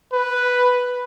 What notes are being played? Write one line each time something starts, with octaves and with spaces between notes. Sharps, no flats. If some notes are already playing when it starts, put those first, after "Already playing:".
B4